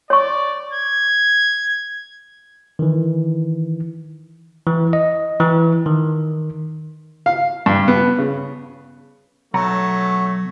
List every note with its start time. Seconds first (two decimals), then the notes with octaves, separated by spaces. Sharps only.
0.10 C#5 D5 C#6
0.73 G#6
2.79 D#3 E3
4.67 E3
4.93 D#5
5.40 E3
5.86 D#3
7.26 F5
7.66 G2
7.88 B3
8.19 C#3
9.54 B1 F#3 A3 F#5 A#5